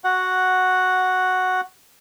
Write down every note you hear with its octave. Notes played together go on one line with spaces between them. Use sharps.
F#4 F#5